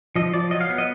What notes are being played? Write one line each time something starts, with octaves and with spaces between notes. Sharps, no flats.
F3 D#5
F3 D5
F#3 D#5
F5
B3
D#5